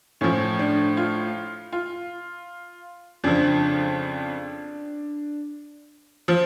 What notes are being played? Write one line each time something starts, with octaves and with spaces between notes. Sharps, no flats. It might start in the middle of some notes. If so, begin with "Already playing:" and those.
A2 F3 C#4
D4
F4
F4
F2 C#3 F3 D4
F3